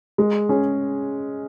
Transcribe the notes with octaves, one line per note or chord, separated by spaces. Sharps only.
G#3
C#4 G#4